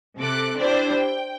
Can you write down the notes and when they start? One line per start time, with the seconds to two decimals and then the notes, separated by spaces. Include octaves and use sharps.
0.18 C3 A4 D6 F#6
0.58 D4 E4 G4 C5 D5
0.95 G5